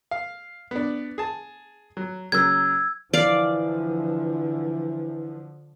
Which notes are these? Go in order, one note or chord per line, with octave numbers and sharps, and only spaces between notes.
F5
B3 D4
G#4 A5
F#3
C#3 F#3 A#3 E6 G#6
D3 E3 F3 D5 F5